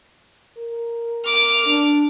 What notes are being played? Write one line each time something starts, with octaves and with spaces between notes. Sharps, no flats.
A#4
D6 F6
D4